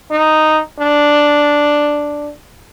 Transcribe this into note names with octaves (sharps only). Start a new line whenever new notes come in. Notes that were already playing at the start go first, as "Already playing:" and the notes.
D#4
D4